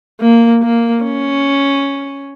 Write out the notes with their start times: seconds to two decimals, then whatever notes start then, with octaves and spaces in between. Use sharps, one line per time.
0.21 A#3
0.63 A#3
1.04 C#4